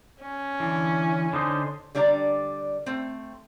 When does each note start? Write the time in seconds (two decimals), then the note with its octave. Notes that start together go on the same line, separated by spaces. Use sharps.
0.21 C#4
0.60 D3 E3
1.33 D3 D#4 C5
1.95 D3 G3 D4 D5 A#5
2.86 A3 C4